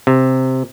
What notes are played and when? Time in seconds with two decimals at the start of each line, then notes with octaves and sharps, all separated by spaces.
0.07 C3